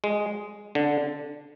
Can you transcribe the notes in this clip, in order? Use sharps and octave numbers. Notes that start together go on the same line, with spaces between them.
G#3
D3